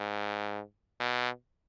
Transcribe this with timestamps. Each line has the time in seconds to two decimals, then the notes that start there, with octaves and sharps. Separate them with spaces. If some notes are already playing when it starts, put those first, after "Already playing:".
Already playing: G#2
1.00 B2